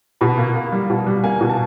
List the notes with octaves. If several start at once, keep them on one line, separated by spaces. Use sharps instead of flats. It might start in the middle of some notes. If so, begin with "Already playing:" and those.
B2 B5
A#3
A#3
G3
B2
G3
A#3 G#5
B2
A5